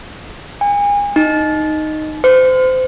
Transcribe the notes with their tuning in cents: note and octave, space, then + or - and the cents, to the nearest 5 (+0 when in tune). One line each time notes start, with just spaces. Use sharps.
G#5 -35
D#4 -5
C5 -30